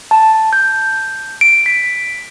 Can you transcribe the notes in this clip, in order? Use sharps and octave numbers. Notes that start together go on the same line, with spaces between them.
A5
G6
D7
B6